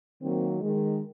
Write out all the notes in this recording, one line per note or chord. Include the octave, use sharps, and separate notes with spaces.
D#3 F#3 A#3 C4
D#3 G#3